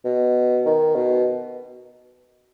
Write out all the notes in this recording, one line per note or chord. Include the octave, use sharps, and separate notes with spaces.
B2
D#3
B2